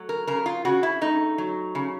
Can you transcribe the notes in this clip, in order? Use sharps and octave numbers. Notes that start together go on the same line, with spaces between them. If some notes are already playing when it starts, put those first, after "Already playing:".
Already playing: F#3 A3
A#4
C#3 A#4
F4
C#3 F#4
E4
A3 D#4
F#3
C#3